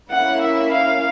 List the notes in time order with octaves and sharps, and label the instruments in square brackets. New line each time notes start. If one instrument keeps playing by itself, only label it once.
[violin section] A#3 C#4 E4 [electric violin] F#5
[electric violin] E5
F5